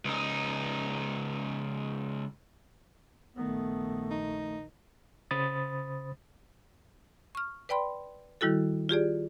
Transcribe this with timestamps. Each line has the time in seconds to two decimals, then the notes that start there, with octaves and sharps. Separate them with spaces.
0.05 C#2 D#4
3.37 A#1 D#3 A3 B3
4.11 D#4
5.31 C#3 C5 B5 D#6 A6
7.35 C#6 F6
7.69 B4 D5 G5 B5 C6
8.41 D#3 G3 E4 F#4 A4
8.89 F4 G4 G#4 D5